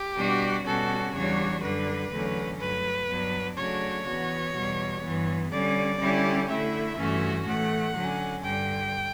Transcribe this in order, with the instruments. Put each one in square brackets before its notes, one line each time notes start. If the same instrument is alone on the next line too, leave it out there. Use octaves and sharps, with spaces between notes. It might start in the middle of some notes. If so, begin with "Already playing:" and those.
Already playing: [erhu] G4
[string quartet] B2 G3 D4 F#4
[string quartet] B2 G3 C#4 F#4 [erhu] A4
[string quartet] E2 C#3 G3 D4 F#4 [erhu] C#5
[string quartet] F#2 D3 G3 D4 [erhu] B4
[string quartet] E2 D3 F#3 A3 C#4
[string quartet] G2 F#3 A3 [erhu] B4
[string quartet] G2 F#3 B3 D4
[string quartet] C#3 F#3 A3 D4 F#4 [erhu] C#5
[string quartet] E3 B3 F#4
E2 B2 G3
G2 E3 B3
[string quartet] D3 G3 C#4 [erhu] D5
[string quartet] D3 G3 C#4 E4 G4
[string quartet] D3 A3 E4 [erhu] E5
[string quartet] G2 E3 A3 C#4 F#4
[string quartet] A2 E3 A3 [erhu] F#5
[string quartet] D3 F#3 C#4
[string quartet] G2 D3 G3 [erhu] G5